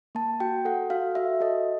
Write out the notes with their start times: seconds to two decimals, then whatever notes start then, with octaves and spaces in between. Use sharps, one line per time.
0.15 A#3 A5
0.40 F#4 G5
0.65 A4 F#5
0.90 F#4 F5
1.15 F#4 E5
1.40 A4 D#5